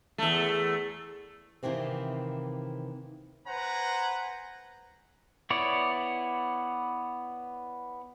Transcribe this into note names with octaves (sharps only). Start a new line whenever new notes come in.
E2 A3
C3 D#3 E3 A#3 C4
B4 C5 F#5 G#5 A#5
B3 E4 C#5 D5